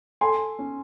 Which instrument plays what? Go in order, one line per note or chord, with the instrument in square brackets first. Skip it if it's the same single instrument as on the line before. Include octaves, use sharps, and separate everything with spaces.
[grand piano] A4 [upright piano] G#5 C6
[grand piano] C#4